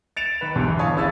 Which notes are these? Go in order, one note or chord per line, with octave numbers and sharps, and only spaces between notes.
A6 C#7 D7 E7 F7
D#3 B4
B1 E2 G2 D3
E3
C#5 F5 G#5 A5 C#6 D#6
E1 A#1 C#4 E4 E6 A6